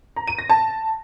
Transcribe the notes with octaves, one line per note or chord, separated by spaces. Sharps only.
A#5
D#7
A#6
A5